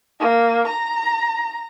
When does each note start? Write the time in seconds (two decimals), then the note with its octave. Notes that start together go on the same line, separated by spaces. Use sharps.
0.20 A#3
0.67 A#5